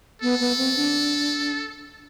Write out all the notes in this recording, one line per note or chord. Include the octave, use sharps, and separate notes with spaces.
B3 A4
B3
C4
D4